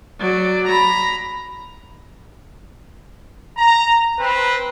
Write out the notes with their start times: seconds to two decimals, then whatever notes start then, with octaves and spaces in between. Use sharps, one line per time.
0.19 F#3 D5
0.67 A#5 B5
3.57 A#5
4.18 C4 B4